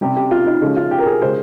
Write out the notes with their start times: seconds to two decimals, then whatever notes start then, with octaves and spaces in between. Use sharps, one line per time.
0.01 C3 G3 G4
0.16 G4
0.31 F4
0.46 D#4
0.61 C#3 F3 G#3 C#4
0.76 F4
0.91 G4
0.98 A#4
1.06 G#4
1.22 C#3 G#3 C5